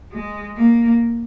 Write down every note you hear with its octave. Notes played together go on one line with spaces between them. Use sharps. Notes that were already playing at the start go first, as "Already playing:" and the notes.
G#3
A#3